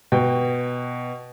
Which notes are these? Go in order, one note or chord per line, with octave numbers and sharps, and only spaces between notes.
B2 G5